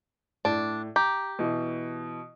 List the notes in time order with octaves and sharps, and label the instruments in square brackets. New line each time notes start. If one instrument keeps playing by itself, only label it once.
[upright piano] A2 [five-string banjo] D4
[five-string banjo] G4 [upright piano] A#5
[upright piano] B2 E3